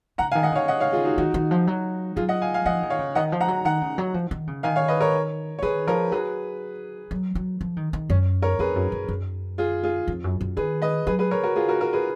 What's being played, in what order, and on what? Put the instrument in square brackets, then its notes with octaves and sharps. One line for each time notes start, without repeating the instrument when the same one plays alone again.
[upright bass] C#3 [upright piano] F#5 A#5
[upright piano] F5 G#5
[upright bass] D#3
[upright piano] D#5 F#5
[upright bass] C#3 [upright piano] C#5 F5
[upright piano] D#5 F#5
C#5 F5
F4 G#4
D#4 F#4
[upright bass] D#3 [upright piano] D#4 F#4
[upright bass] D#3
F3
F#3
[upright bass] F#3 [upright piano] F4 G#4
[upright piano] D#5 F#5
F5 G#5
F5 G#5
[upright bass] F3 [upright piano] D#5 F#5
[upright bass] D#3
[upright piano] C#5 F5
[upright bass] C#3
[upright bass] D#3 [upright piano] D#5 F#5
[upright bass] F3
[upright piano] F#5 A#5
[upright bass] F#3
[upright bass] D#3 [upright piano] F#5 A#5
[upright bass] C#3
F#3
F3
D#3
C#3
[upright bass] D#3 [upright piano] F5 G#5
[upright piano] C#5 F5
B4 D#5
A#4 C#5
C#5
[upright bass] D#3 [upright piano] G#4 B4
[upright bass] F3 [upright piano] A#4 C#5
[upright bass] F#3 [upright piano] G#4 B4
[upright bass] F#3
F#3
F3
D#3
D#3
[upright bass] F#2 [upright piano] C#4
[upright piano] A#4 C#5
[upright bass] F2 [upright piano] G#4 B4
[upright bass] F#2
F#2
F#2
[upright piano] F4 G#4
F4 G#4
[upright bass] F2
F#2
F#2
[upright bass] D#3 [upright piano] G#4 B4
[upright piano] B4 D#5
[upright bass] F#3 [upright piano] G#4 B4
[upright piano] G#4 B4
A#4 C#5
F#4 A#4
F4 G#4
F#4 A#4
F#4 A#4
G#4 B4